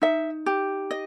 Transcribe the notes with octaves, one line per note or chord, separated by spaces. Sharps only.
D#4 E5
G4
D#5